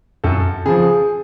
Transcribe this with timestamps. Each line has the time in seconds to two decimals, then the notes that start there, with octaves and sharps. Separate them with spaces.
0.24 F#2 A4
0.66 C#3 F3 G#4